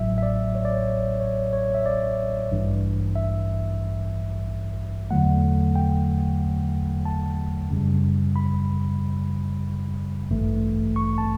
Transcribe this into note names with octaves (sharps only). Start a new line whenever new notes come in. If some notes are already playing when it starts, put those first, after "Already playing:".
Already playing: A1 A2 F#3 E5
E5
D5
C#5
D5
C#5
C#5
C#5
E5
D5
A1 G2 E3
E5
E2 D3 F#3 A3 F#5
G5
A5
F#2 C#3 G3
B5
A1 G2 E3 A3
C#6
A5